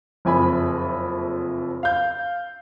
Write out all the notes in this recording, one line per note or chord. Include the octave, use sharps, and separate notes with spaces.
F#1 F2 G#5 B5
F5 G6